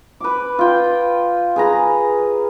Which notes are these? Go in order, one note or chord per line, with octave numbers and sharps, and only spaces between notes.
B4 D6
F4 G5
G#4 B4 A#5